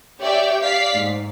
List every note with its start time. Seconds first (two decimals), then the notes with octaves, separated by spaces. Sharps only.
0.20 G4 C#5 D5 E5 G5
0.62 D5 F5 B6 C7
0.94 G#2